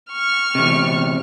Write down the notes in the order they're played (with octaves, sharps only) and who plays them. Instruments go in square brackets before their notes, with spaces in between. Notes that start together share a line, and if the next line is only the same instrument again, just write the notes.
[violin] C#6 F6
[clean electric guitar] E2 C3